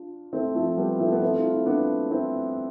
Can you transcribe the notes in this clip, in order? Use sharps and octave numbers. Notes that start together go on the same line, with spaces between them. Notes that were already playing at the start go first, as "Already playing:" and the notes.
Already playing: D4 F4
A3 C4
F3 A3
G3 B3
F3 A3
B3
A3 C4
F4
E4
B3 D4
C4 E4